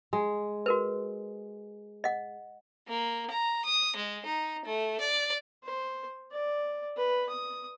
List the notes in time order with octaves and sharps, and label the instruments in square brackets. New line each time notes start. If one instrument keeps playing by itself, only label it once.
[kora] G#3
[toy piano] F#4 A#4 B4
D#5 F#5
[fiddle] A#3
A#5
D#6
G#3
D#4
A3
D5
[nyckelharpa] C5
D5
B4
D#6